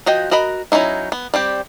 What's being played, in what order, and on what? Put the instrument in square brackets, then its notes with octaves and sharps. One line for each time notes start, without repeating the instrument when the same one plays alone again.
[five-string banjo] F3 F#4 D#5 G5
F#4 A#4 D#5 B5
F#3 G3 C#4 D#4 E4
B3
G3 C4 G4